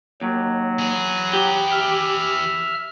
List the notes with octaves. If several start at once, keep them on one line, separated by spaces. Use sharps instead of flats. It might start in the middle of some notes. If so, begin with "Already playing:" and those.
D#2 F#3
E3 G#4
G4
E5 F6